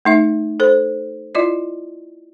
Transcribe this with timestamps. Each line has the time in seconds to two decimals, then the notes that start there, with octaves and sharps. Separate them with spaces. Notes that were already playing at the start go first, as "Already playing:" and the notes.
0.05 A3 D#4 E5
0.60 A4 C5
1.35 E4 F4 D5 D#5